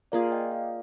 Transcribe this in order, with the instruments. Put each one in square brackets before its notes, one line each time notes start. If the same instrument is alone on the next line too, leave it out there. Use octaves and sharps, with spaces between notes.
[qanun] A#3 F4 G#4 [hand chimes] D5 F5
[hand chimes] D#5 G5
D5 F5